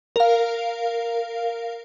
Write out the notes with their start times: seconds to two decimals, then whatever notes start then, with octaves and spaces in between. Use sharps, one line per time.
0.16 A#4 F5